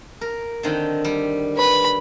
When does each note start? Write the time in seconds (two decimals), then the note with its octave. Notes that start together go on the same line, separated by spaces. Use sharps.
0.21 A#4
0.63 D3 D#3 C4
1.05 G3
1.56 B4 B5